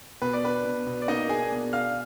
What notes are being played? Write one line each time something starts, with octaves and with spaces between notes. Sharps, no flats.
B2 B4
D5
D4 B4
B2
B2
D5
A#3 D#4 D#5
D4 G#4 G#5
B2
D4 F5 F6